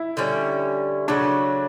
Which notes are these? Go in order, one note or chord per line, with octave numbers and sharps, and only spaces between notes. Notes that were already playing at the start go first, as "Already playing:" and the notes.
Already playing: E4
D3 G3 C#4
C#3 F#3 A3 D4